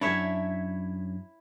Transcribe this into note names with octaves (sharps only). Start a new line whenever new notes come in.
F#2 D4 E4 C#5 E5